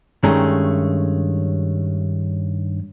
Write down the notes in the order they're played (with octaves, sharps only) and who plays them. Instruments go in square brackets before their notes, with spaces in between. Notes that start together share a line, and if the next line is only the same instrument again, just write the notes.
[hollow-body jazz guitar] G2 D#3 G#3 A3 C#4 A#5